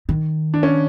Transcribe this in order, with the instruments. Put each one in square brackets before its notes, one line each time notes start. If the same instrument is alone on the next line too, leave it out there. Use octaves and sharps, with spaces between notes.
[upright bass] D#3
[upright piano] D4
C#4